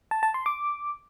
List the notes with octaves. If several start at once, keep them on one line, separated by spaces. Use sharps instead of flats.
A5
A5
C6
D6